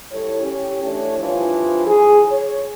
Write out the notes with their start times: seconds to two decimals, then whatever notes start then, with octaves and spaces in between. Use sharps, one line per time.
0.12 G3 E4 A4 C#5
0.42 C#4 G4
0.83 E3 A3 D4 C#5
1.19 G2 E3 F3
1.86 G#4
2.29 C#5